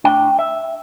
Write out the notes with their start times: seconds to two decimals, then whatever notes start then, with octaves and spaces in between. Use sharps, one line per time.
0.04 A2 A3 D4 G5
0.39 E5